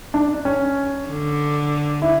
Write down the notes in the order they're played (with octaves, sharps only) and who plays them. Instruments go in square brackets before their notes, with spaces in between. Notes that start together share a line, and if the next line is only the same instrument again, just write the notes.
[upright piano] D4
C#4
[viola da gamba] D3
[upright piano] E4